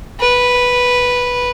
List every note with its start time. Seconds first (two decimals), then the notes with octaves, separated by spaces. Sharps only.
0.20 B4